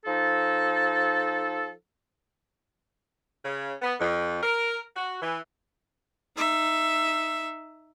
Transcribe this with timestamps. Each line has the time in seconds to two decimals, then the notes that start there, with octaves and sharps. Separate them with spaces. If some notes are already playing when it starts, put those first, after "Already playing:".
0.06 F3 D#4 A4
3.45 C#3
3.82 B3
4.00 F2
4.42 A#4
4.96 F#4
5.22 E3
6.37 D#4 E5